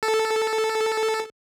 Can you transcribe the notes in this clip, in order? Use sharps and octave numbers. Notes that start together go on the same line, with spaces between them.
A4